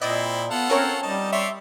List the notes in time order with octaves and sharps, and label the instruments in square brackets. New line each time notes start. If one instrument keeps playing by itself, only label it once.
[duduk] A#2 [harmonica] C4 E4 [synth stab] D5 D#5
[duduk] B3 [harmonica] F4 A4 F#5
[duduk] C4 [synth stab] C#4 A#4 C#5
[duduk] G3 [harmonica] D#4 A5
[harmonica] C#5 D5 C6 [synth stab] E5